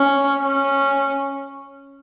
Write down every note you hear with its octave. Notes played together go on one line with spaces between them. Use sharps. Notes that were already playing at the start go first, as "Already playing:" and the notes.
Already playing: C#4
C#4